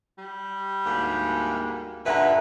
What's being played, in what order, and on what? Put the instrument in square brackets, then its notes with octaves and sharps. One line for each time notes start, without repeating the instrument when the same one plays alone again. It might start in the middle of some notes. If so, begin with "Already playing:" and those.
[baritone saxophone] G3
[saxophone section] D2 G#2 A#3
[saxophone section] G2 A#2 B4 [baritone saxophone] D3 [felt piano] E5 F#5 A#5